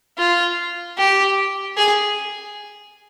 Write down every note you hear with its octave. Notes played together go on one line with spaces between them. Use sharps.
F4
G4
G#4